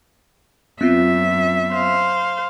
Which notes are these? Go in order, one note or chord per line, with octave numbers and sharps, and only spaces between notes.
F#2 B3 C4 F4 E5
C5 F5